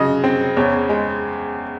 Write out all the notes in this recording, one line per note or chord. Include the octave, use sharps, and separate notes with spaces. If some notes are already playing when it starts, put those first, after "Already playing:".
Already playing: C#3 F#3 D#5
C4
E2 C#5
G#3